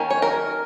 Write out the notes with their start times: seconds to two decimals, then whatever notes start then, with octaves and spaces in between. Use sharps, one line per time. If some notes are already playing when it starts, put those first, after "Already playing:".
Already playing: D#3 A#3 C#4
0.10 C#5
0.22 A#4